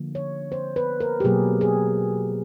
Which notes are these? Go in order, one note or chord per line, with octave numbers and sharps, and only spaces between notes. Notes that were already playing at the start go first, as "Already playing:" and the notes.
Already playing: D3 F3 A#3
C#5
C5
B4
A#4
G4
B2 F#3 A#3 G#4
G#4